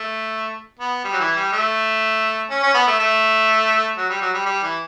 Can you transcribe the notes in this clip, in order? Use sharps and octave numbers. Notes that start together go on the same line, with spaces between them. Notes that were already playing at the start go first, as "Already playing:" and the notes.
Already playing: A3
B3
G3
F#3
E3
G3
A3
C#4
C#4
B3
A3
A3
F#3
G3
F#3
G3
G3
E3